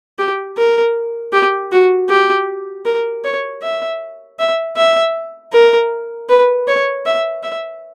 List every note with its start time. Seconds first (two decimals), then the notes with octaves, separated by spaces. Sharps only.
0.18 G4
0.57 A#4
1.33 G4
1.72 F#4
2.09 G4
2.85 A#4
3.24 C#5
3.62 E5
4.39 E5
4.76 E5
5.53 A#4
6.29 B4
6.68 C#5
7.06 E5
7.43 E5